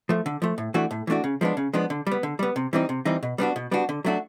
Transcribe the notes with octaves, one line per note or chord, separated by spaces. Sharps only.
F3 A3
D3
F3 A3
A2
E3 A3 D4 F#4
A2
E3 A3 D4 F#4
C#3
F3 G#3 B3 D4
C#3
F3 G#3 B3 D4
D3
G3 B3
D3
G3 B3
C3
E3 G3 C4 D#4
C3
E3 G3 C4 D#4
B2
G3 B3 D4 F#4
B2
G3 B3 D4 F#4
D3
F#3 A3 D4 F#4